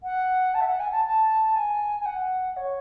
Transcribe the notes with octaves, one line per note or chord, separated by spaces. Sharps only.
F#5
A5
E5
F#5
G#5
A5
A5
G#5
G#5
F#5
C#5